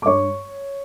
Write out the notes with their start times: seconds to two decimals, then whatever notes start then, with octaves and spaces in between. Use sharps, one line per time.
0.02 D6
0.06 G2 C#5 C#6